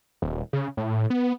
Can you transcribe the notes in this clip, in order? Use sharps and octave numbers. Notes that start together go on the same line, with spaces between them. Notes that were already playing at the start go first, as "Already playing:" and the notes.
D#1
C#3
A2
B3